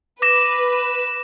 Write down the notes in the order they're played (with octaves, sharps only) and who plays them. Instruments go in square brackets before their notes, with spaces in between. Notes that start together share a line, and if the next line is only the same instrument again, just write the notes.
[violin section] B4 [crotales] D6 A#6 E7